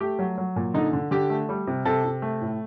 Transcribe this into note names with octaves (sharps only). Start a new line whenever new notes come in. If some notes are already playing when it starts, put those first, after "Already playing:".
A3 G4
F#3
F#3
A#2
D3 D#4
D3
D3 G4
A3
G3
C3
C3 A4
C3
A3
A2